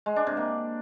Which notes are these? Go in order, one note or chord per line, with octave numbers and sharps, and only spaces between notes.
G#3
D4
C3
A#3